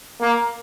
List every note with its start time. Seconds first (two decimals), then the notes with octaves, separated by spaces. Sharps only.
0.21 A#3